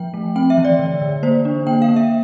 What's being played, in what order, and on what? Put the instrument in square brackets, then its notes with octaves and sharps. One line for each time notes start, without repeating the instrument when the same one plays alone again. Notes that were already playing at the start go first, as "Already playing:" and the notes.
Already playing: [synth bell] F3 G5
A3
C4 G5
E5
E3
D5
D3
D3
A#3 C5
D4
A#3 G5
F5
A#3
E5